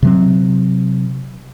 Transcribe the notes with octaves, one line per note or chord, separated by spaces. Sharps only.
C3 F#3 C4